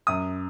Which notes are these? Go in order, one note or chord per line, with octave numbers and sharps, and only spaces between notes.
F#2 D#6